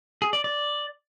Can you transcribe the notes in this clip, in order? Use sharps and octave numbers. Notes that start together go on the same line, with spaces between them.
G#4
D5
D5